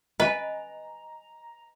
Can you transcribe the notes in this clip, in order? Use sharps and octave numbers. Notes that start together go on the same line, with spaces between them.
B4 D#5 G#5 A#5